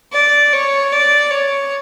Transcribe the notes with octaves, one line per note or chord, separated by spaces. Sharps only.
D5
C#5
D5
C#5